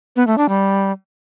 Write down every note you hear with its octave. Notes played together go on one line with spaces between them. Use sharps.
B3
A3
D4
G3